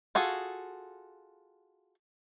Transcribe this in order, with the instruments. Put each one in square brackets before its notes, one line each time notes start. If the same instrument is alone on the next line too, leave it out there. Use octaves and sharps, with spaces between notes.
[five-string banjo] F4 F#4 G#4 A4